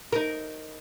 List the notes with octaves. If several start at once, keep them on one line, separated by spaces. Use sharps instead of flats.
D#4 A#4